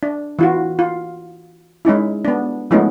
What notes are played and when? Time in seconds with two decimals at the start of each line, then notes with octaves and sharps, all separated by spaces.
0.03 D4
0.39 E3 F4 F#4
0.79 F4
1.85 G#3 C#4 D#4 E4
2.25 B3 D4
2.71 F3 G#3 A3 B3 C#4 D#4